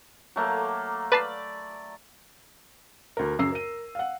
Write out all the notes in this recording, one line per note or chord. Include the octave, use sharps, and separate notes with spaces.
F#3 A3 A#3
B4 D5 A5 B5 C7
D2 A#4
F#2 C#3 A#5 E6 C7
A#4 D#7
F5 F#5